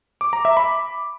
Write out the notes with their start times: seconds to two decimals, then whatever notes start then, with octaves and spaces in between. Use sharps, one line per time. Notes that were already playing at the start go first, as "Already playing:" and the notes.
0.21 D6
0.33 A#5
0.45 E5
0.57 B5